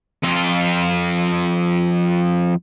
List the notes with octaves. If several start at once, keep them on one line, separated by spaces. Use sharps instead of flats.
F2 F4